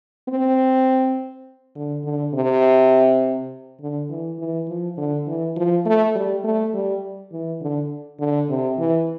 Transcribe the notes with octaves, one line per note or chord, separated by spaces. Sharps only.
C4
D3
D3
C3
D3
E3
E3
F3
D3
E3
F3
A3
G3
A3
G3
E3
D3
D3
C3
E3